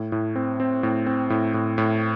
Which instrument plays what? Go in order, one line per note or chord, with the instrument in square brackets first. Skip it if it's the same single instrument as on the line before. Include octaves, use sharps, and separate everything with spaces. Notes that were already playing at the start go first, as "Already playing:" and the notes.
Already playing: [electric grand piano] A2
A2
C4
C4
A2
C4
A2
A2
A2